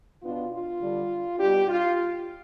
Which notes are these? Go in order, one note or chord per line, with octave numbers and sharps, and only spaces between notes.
B2 B3 D4 F4
F4
D3 G3 D4
B2 G3 D4 G4
F4